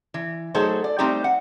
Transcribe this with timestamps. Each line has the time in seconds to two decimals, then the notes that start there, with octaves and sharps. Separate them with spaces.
0.14 E3
0.54 F#3 A3 D#4 G#4 A4 C5
0.84 D5
0.99 G3 A3 C4 D#4 G4
1.24 F#5